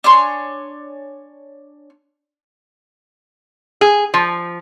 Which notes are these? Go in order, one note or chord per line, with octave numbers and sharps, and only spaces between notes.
D4 C#5 G#5 C6
G#4
F3